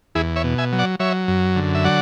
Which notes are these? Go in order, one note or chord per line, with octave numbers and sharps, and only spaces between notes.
E2 E4 G#4
C#5 E5
B2
E5 G#5
F#3
D5 F#5
F#3 C#5 E5
F#2
D3
E5
F#3 D5 F#5